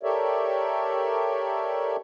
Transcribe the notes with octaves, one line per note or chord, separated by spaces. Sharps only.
G4 A4 A#4 C#5 D5 E5